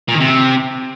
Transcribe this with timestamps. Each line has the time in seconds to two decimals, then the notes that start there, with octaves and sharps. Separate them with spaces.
0.09 A#2
0.14 D#3
0.20 C3